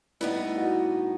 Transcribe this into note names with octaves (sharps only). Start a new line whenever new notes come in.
A2 G3 B3 D#4 E4
F#4